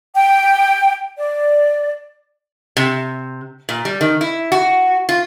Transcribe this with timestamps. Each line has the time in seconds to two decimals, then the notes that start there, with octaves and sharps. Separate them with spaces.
0.15 G5
1.18 D5
2.77 C3
3.69 A#2
3.85 G3
4.01 D#3
4.21 E4
4.52 F#4
5.09 F4